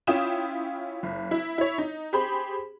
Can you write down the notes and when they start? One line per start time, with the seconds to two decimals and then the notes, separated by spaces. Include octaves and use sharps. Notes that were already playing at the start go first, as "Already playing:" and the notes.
0.07 C#4 E4 F4 G5 D#6 E7
1.03 F#1
1.31 E4
1.58 E4 C#5
1.78 D#4
2.13 G4 G#4 C5 B5